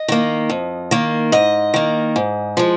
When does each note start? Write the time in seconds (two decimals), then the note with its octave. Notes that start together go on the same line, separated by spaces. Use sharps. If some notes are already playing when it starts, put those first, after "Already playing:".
Already playing: D#5
0.08 D#3 A#3
0.50 F2
0.91 D#3 A#3
1.32 G#2 D#5
1.74 D#3 A#3
2.16 G#2
2.57 F3 G#3